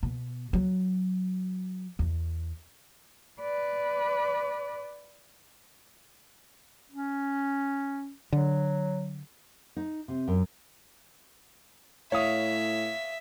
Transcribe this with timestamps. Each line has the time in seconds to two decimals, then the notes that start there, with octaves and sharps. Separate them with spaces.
0.03 B2
0.53 F#3
1.99 E2
3.40 B4 D5
6.92 C#4
8.33 D3 F#3
9.76 D#4
10.08 C3
10.28 F#2
12.12 A2 C#5 E5 F5 D#6